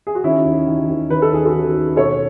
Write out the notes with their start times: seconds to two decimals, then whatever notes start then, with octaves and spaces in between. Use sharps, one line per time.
0.07 G#4
0.15 F#4
0.24 D#3 C#4 E4
0.46 D#2
0.67 D#3
0.89 D#2
1.10 D#3 B4
1.22 A4
1.33 D#2 G#4
1.45 F#4 A4
1.53 D#3
1.75 D#2
1.96 B2 A4 C#5